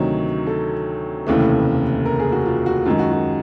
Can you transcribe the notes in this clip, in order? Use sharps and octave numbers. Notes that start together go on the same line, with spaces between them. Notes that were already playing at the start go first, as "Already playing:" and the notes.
Already playing: D2 C3 D#3 F#3 C#5
A4
F1 D#2 C#3 E3 A3
A#4
G#4
F#4
F4
F#4
F#2 D#3 G#3 F4
F#4
F#4